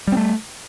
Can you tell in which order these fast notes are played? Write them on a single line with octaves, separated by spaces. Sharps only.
G3 C4 A3